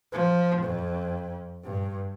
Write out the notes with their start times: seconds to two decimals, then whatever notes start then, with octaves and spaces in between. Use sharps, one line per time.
0.12 F3
0.62 F2
1.64 G2